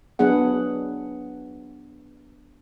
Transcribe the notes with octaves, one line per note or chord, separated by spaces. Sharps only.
F#3 B3 D4 G#4 F#5